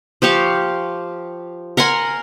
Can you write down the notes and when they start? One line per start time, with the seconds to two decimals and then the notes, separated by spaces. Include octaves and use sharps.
0.22 F3 G4 F5 C#6
1.77 A#4 F#5 G#5 C6